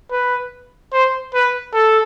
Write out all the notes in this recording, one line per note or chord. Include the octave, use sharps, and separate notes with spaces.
B4
C5
B4
A4